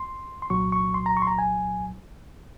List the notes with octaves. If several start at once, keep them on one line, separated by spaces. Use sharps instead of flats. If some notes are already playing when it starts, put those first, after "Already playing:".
Already playing: C6
C6
C2 A#2 F#3 C#6
C#6
C6
A#5
C#6
C6
A#5
G#5